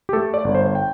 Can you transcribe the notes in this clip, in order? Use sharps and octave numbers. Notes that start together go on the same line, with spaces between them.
G4
A3 A4
D5
G1
C5
G5